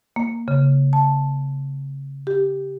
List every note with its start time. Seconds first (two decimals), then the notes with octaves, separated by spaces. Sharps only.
0.16 A#3
0.48 C#3
0.93 A5
2.27 G4